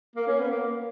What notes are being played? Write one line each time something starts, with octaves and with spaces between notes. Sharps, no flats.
A#3
C#4
B3
A#3